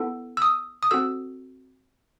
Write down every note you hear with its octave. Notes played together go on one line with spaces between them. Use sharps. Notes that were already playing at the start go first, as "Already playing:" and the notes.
Already playing: B3 E4 A4
E6
D#6
D#6
C4 F#4 A4 E6